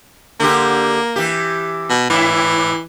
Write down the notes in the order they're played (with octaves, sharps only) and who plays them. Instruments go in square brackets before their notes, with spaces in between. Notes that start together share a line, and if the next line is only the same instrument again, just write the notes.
[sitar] D3 G4 [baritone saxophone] A#3
[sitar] E3 G4
[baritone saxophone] B2
[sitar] G#2 E4 [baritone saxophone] E3